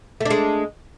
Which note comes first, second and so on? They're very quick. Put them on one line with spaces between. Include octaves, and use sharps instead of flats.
A3 D4 G#3